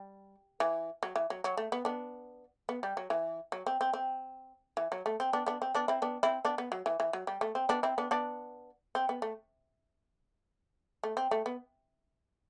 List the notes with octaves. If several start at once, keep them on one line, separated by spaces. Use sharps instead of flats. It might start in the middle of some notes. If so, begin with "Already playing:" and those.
Already playing: G3
E3
F#3
E3
F#3
F#3
A3
B3
B3 D4
B3
G3
F#3
E3
F#3
C4
C4
C4
E3
F#3
A3
C4
B3 D4
B3 D4
C4
B3 D4
C4 E4
B3 D4
C4 E4
B3 D4
B3
F#3
E3
E3
F#3
G3
A3
C4
B3 D4
C4 E4
B3 D4
B3 D4
C4
B3
A3
A3
C4
A3
B3